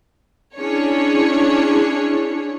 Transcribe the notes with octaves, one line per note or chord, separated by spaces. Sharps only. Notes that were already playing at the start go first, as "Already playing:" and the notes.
C#4 D4 E4 G#4 C#5